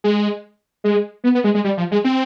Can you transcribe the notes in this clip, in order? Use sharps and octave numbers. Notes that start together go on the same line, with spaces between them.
G#3
G#3
B3
B3
G#3
G#3
G3
F3
G#3
C4